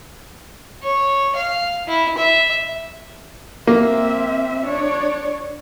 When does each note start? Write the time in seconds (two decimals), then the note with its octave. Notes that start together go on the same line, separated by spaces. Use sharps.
0.83 C#5
1.36 F5
1.88 E4
2.18 E5
3.67 A#3 C4 E5
4.67 D4 C#5